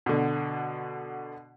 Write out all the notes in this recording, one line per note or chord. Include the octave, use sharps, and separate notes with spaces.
B2 D3